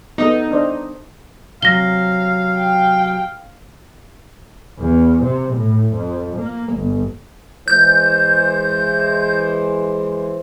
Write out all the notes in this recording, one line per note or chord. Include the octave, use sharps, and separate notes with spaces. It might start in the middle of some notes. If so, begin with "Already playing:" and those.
B3 D#4 A4
D4 C5
C3 F#3 F5 A#6 G7
G5
E2
C3
A2
F2
A#3
G1
E3 G#3 C5 G6